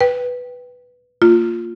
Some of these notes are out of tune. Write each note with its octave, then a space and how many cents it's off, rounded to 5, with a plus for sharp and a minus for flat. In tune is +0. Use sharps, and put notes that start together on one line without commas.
B4 +0 G5 +0
A#3 -20 F4 +0